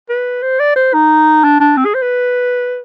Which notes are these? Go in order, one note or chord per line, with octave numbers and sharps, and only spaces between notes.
B4
C5
D5
C5
D#4
D4
D4
C4
G#4
C5
B4